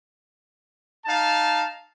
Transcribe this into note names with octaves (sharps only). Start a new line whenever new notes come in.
D#4 F5 A5